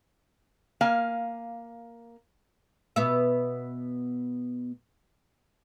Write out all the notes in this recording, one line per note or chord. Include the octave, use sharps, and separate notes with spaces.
A#3 F5 G#5
B2 B3 E5